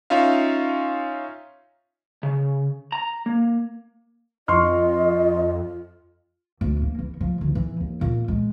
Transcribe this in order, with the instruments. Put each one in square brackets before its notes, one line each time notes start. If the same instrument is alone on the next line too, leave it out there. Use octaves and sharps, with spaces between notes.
[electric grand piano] C#4 D#4 F4 E5 F5
[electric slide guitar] C#3
A#5
A#3
[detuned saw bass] F2 [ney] F4 [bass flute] D#5 [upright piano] C6 C#6 F6
[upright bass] D2
A#3
E3
F3
D2
E3
D#2
A#2
G#3